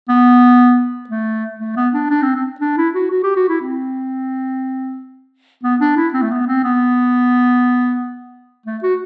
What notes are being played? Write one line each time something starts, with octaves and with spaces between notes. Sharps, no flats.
B3
A3
A3
B3
D4
D4
C4
C4
D4
E4
F#4
F#4
G4
F#4
E4
C4
B3
D4
E4
C4
A3
B3
C4
B3
A3
F#4